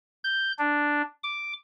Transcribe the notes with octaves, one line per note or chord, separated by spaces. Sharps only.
G6
D4
D6